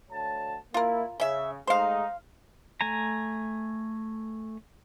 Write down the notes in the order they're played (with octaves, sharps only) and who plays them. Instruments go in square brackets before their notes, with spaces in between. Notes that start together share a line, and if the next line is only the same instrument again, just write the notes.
[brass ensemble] D2 C#5 A5
[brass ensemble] A#3 E4 [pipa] F4 A#4
[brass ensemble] C#3 [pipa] C#4 E5
[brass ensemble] G#3 A3 D#4 [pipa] C5 F5
[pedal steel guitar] A3 G#5 A#5